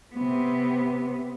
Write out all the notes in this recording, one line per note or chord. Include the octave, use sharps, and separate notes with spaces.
C3 B3